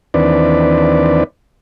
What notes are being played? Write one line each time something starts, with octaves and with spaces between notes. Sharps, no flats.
D#2 E3 C4 D4 B4 D5